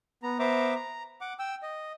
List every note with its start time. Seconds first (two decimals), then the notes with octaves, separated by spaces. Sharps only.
0.23 B3 A#5
0.39 B3 C5 E5 A#5 D6
0.75 A#5
1.21 F#5 D6
1.39 G5 E6
1.63 D#5